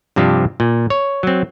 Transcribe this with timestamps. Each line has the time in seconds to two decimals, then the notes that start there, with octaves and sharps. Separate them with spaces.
0.16 G2 C3 F3 D4 G4
0.60 A#2
0.90 C#5
1.23 F#3 C4